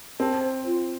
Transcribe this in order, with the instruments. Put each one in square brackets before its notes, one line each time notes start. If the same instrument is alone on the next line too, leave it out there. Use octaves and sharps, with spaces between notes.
[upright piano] C4 [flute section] A5
[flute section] C5
F4